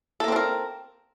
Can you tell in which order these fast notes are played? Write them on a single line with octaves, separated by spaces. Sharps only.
A4 A#3 C4 D4 A#4